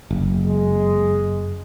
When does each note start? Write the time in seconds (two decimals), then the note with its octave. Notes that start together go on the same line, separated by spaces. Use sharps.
0.11 F#1
0.47 G#3